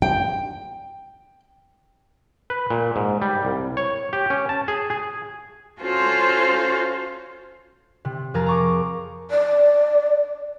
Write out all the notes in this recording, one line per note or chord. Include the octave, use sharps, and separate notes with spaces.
G5
B4
A#2
G#2
G3
C2
C#5
G4
C#4
A5
G#4
G#4
C#4 F4 F#4 A4 C5
C3
F2 F3 G#4 A#4 A#5 A6
A#5 C#6 D6
D5